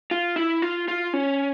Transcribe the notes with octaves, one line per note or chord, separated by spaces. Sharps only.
F4
E4
F4
F4
C#4